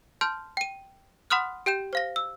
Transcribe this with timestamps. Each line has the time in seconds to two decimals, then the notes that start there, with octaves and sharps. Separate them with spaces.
0.21 A5 C6 F6 G6
0.57 G5 D#7
1.30 F#5 B5 C6 D#6 F6 F#6
1.66 G4 G5 G6 E7
1.93 C5 F5 A#6
2.16 E6